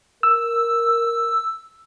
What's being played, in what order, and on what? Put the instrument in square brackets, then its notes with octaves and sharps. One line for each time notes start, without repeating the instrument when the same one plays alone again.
[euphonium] A#4 [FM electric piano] E6